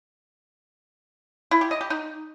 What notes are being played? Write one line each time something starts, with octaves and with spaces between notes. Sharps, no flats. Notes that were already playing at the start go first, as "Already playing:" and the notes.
E4
G4
D#5
G4
D#4